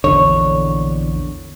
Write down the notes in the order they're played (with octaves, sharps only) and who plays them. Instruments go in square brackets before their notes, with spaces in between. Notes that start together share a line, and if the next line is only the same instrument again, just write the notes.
[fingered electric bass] A#1 E2 D3 [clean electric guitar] C#5